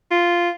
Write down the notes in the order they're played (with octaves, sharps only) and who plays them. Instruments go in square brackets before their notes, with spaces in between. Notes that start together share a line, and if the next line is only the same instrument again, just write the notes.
[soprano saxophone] F4